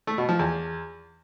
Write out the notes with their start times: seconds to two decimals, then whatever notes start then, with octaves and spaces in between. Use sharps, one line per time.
0.07 A3
0.18 B2
0.29 F3
0.39 E2